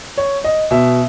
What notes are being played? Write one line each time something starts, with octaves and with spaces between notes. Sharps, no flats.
C#5
D#5
B2 E5